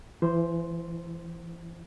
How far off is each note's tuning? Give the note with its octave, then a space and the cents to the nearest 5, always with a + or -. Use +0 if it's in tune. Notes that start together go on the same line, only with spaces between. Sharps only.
E3 +30 E4 -5 C5 +0